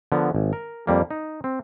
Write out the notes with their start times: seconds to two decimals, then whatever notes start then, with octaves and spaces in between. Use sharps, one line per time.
0.12 D3 F3 B3 A#4
0.35 G#1
0.53 A#4
0.87 F2 G3 A#3
1.11 D#4
1.44 C4